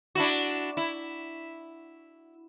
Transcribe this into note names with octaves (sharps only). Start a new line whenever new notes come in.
D4 E4 F#4
E4